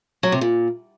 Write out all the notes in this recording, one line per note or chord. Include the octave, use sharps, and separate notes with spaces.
F#3
C3
A#2